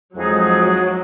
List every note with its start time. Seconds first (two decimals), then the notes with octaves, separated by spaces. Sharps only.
0.16 F2 F3 F#3 G#3 D#4 G#4